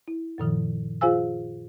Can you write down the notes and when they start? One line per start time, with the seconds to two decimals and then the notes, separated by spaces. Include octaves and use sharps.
0.08 E4
0.38 F#2 A#2 D#3 F3
1.01 F4 G#4 C5 F5 G#5 E6